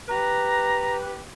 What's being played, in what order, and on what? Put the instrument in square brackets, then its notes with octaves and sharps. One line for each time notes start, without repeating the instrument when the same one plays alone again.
[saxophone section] G4 B4 [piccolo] A#5